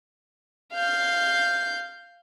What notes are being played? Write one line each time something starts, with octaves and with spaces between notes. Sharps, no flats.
F5 G6